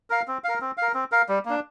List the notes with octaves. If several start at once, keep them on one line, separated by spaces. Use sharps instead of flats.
A#4 F5
C4
A#4 F5
C4
A#4 F5
C4
A#4 F5
G3
A#3 D4